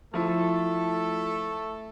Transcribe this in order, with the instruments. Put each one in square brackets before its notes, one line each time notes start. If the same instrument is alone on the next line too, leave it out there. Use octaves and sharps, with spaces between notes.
[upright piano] F3 E4 [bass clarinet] A3 [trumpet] A4